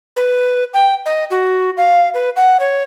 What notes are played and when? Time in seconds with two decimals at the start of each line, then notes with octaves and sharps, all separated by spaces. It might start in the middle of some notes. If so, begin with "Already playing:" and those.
0.16 B4
0.74 G5
1.06 D#5
1.31 F#4
1.77 F5
2.14 B4
2.36 F#5
2.60 C#5